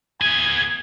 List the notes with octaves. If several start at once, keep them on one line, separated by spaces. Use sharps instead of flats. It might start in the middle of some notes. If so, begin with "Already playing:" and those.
B3 G#4 G#6